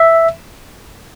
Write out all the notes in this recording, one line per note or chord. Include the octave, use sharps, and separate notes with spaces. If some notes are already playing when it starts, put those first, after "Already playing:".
Already playing: E5